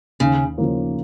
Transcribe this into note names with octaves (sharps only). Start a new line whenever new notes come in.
D#2 C#3
C#3 F3 A#3 F4